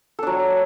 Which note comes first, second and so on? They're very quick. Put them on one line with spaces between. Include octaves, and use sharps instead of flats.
A4 D4 F#3